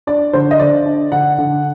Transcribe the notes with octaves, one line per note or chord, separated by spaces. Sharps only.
D4 D5
D3 C5
D#5
D3 D5
D4
D3 F#5
D3